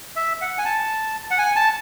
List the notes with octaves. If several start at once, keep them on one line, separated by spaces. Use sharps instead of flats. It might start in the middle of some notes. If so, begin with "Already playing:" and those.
E5
F#5
G#5
A5
F#5
G#5
A5